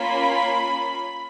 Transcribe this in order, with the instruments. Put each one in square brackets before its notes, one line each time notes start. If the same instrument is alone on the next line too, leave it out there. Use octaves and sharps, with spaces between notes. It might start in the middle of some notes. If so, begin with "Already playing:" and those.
Already playing: [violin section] A#3 C#4 F4 B5